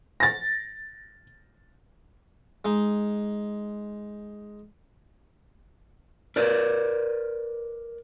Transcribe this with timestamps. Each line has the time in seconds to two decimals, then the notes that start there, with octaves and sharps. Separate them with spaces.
0.20 A6 A#6
2.65 G#3 D#4
6.36 A#4 B4 D5